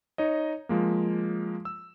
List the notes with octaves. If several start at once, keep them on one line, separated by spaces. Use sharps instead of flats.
D#4 C#5 D#5
F3 G#3 A#3
E6